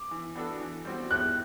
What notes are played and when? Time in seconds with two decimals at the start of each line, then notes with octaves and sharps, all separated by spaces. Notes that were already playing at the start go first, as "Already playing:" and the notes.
Already playing: D6
0.11 E3
0.36 B3 D4 F#4 A4
0.60 E3
0.85 G3 C4 F#4
1.10 A2 F#6